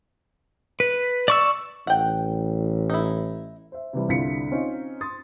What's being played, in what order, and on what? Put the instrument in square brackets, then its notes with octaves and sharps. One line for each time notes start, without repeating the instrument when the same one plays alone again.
[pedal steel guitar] B4
D5 C#6 E6
[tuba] A1 [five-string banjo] F#5 G5
[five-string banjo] D#4 E4
[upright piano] C5 E5
C3 E3 G3
C2 D3 E4 F4 B6 C#7
C4 C#4 D#4 F4
C6 D#6 A6